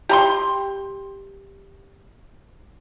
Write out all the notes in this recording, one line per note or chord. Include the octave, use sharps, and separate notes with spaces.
G4 A#5 C6